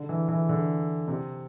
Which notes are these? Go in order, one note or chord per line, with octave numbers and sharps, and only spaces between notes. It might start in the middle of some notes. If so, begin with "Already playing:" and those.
Already playing: D3
E3
E3
D3
C3